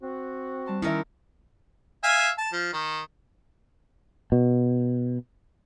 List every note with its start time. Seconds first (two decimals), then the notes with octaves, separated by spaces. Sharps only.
0.01 C4 F#4
0.66 G3 A5 C6
0.82 D#3 C#4 E4 A#4 E5
2.04 E5 F5 G#5
2.38 A5
2.53 F3
2.73 D#3
4.32 B2